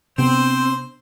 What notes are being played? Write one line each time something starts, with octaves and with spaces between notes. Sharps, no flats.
C3 B3 C4 D4 C5